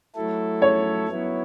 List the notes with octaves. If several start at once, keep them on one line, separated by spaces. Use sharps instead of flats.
F#3 A3 E4 A4
C#5
F#3 B3 E4